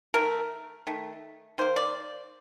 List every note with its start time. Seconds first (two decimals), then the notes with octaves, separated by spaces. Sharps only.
0.14 D#3 A3 A#4
0.87 D#3 A3
1.58 D#3 A#3 C5
1.76 D5